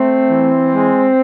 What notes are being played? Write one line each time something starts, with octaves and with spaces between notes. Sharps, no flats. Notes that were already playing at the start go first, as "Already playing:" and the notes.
Already playing: A3 C4
E3
G#3